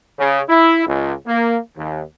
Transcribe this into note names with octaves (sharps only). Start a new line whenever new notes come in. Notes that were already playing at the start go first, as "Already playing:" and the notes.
C#3
E4
C#2
A#3
D#2